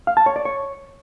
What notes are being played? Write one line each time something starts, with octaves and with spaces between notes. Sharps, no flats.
F5
A5
C#5
D5
C#5